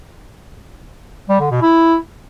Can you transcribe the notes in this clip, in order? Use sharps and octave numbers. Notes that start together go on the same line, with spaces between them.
G3
D3
B2
E4